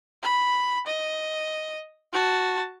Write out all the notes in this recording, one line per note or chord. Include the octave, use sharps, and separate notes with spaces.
B5
D#5
F#4 A5